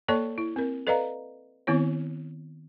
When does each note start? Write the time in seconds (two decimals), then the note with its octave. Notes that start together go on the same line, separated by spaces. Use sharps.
0.08 A#3 A4 C#5 D5 A5 C#6
0.38 E4
0.56 C4 A#4
0.87 A4 B4 D5 D#5 F5 A#5
1.67 D#3 B3 C4 E4 C#5